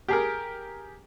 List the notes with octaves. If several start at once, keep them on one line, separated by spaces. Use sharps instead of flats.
G4 G#4 A#4